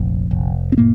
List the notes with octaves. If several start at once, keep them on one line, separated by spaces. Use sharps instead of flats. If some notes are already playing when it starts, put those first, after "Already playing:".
Already playing: F1 A#1
F1
C4
A2 A#3